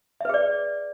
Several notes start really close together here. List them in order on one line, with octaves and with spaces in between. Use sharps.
E5 B4 G#4 D5